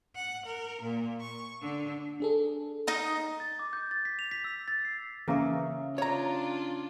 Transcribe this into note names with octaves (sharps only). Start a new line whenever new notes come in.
F#5
A#4
A#2
C#6
D3
D4 G#4 A4
D#4 D#5 D#6
A6
D6
G6
A6
B6
F7
B6
E6
A6
C7
C#3 E3 A#3 C#4 E5
D4 F4 C#5 A#5